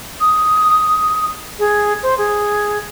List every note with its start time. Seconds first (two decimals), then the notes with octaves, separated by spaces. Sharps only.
0.21 D#6
1.59 G#4
2.03 C5
2.18 G#4